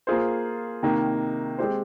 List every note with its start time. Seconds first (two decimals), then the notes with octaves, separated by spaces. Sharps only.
0.07 A#3 F4 G#4 C5
0.83 C3 D#3 A#3 D#4
1.58 G#3 C4 G4 C5